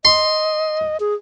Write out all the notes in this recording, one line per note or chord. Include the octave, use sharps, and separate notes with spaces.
D#5 C6
G#4